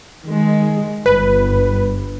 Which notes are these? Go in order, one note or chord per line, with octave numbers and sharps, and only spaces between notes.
D#3 G#3
G1 B4